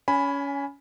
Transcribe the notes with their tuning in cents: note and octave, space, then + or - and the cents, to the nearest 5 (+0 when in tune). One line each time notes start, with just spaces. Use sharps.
C#4 +25 G#5 +0 B5 +0